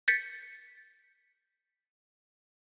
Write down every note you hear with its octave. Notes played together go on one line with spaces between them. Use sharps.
G6 A6 B6 C#7